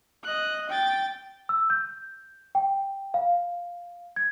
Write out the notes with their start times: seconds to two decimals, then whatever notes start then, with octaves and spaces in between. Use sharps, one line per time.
0.23 D#5 F#6
0.69 G5 A6
1.49 E6
1.70 G6
2.55 G5
3.14 F5
4.16 G#6